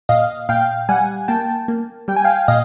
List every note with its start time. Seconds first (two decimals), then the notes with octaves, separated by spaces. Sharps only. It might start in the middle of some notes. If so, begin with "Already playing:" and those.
0.09 A#2 D#5 F5
0.49 A#2 F5 G5
0.89 G3 F#5 G#5
1.28 A#3 G5 A5
1.68 A#3
2.08 G3 G5
2.16 G#5
2.24 F5 G5
2.48 A#2 D#5 F5